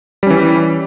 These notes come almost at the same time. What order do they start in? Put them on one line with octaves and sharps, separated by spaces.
G3 C#4 E3